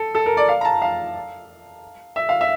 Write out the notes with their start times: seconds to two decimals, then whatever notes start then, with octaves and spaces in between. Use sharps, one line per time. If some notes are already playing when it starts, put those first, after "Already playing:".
Already playing: A4
0.15 A4
0.26 A#4
0.37 D5
0.49 F5
0.61 A#5
0.65 A5
0.82 F5
2.16 E5
2.29 F5
2.41 E5